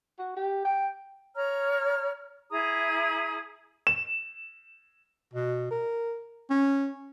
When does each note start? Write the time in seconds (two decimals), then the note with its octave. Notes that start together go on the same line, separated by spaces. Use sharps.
0.19 F#4
0.37 G4
0.65 G5
1.35 C#5 A#5 F6
2.50 E4 G#4 A#5 D#6
3.87 E7
5.33 B2
5.71 A#4
6.50 C#4